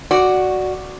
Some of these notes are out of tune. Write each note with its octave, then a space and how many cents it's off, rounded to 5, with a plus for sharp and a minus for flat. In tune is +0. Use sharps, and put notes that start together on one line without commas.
F#4 +0 D5 +0